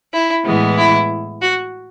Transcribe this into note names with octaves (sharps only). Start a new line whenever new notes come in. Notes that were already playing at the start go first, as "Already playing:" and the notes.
E4
A2 E3 G#3 B3
E4
F#4